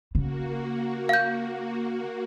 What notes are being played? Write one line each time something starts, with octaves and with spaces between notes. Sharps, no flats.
C#3 A#3 F#4
F5 G6